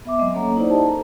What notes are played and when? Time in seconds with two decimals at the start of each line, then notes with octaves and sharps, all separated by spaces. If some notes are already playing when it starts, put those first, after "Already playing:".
0.05 B3 E5 D6
0.18 F#3 G#3 C4 D#5
0.34 A#3 C#4 A4 C#5 F#5 A#5
0.57 D#4 E4 C5 D5
0.70 D#4 E4 G4 G#4 D#5 A5
0.87 A4 A#4 A#5